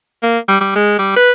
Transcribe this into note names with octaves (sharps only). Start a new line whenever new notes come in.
A#3
G3
G3
G#3
G3
B4